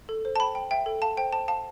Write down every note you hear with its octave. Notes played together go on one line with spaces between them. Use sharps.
A4
C5
A5
G5 B5
G5
E5 G5
A4
F5 A5
C5 G5
C5 A5
F5 A5